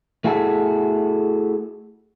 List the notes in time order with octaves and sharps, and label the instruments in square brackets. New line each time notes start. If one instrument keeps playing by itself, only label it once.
[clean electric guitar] A3 E4 F#4 G#4 A4